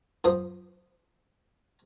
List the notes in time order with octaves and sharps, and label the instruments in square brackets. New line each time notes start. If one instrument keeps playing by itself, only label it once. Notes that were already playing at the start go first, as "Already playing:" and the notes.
[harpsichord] F#2 F3 D#6